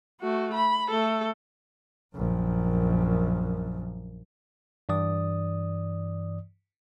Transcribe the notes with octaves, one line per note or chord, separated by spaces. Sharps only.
A3 F#4
B5
A3 A4
A#1 F#2
G2 E3 D5 D#6